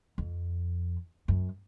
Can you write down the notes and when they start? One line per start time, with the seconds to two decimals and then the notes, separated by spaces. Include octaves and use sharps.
0.18 F2
1.28 F#2